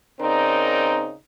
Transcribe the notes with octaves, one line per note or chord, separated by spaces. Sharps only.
C#3 C4 D#4 A#4 D5